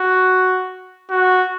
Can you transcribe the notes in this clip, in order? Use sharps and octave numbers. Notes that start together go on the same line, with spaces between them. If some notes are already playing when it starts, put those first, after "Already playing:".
Already playing: F#4
F#4